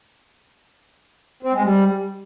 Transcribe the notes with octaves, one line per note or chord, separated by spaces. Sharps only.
C4
G#3
G3